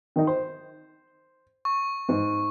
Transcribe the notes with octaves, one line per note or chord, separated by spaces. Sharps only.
D#3 D#4
C5
C#6
G#2